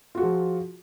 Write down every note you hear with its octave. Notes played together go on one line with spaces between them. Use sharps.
F3 F4 F#4 G#4